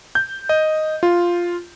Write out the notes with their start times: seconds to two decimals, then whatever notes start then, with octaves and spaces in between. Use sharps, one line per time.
0.15 G6
0.49 D#5
1.03 F4